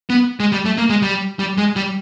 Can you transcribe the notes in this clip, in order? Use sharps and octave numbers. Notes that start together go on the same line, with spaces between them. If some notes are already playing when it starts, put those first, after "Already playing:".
B3
G#3
G3
A3
A#3
G#3
G3
G3
G#3
G3